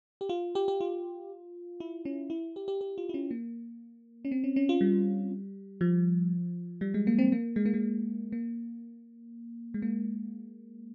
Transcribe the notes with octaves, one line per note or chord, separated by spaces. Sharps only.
G4
F4
G4
G4
F4
E4
C#4
E4
G4
G4
G4
F4
E4
C#4
A#3
C#4
C4
C#4
C#4
F4
G3
F3
G3
G#3
A#3
C4
A#3
G#3
A#3
G#3
A#3
G#3
A#3